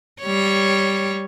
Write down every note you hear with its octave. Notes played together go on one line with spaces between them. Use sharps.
G3 C#5